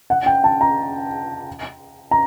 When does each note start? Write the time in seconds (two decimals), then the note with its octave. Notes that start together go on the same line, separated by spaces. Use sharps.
0.10 F#5
0.26 G5
0.44 A5
0.61 A#5
2.11 A#5